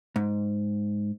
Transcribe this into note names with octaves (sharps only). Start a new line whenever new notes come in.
G#2